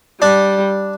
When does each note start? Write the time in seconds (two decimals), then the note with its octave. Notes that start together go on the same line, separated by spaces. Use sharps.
0.21 G3 D4